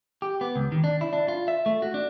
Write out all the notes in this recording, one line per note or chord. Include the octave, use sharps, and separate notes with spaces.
G4
B3
C#2
D#3
D4
E4
D4
F4
E5
A3
F#4
D4